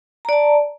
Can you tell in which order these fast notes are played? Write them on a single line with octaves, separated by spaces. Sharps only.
A#5 D5 A5